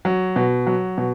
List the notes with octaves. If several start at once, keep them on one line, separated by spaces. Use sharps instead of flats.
F#3
B2
F#3
B2